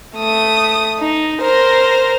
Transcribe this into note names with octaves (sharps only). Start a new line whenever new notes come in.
A3 D#6
D#4
A#4 C5